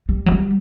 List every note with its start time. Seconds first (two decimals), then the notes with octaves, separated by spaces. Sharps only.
0.09 G3
0.26 F#3
0.32 G3